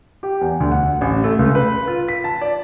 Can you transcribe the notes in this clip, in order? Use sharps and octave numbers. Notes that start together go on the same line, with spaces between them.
G4
E2
D2
F#5
A1
A3
C#2
B4
F4
B6
A5
D5